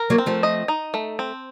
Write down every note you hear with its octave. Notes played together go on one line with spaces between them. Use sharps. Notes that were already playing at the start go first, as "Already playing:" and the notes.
Already playing: A#4
F#3 A#3
C4
F3 A3
D#5
D#4
A3
C4